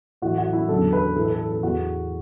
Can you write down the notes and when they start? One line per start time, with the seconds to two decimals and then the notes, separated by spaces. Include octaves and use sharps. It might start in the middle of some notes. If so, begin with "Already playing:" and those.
0.22 A2 E3 F#4
0.38 F#4
0.53 E4
0.69 E2 D3 F#3 A4
0.93 B4
1.16 A2 E3 A4
1.25 B4
1.34 A4
1.52 A4
1.63 E2 E3 F#4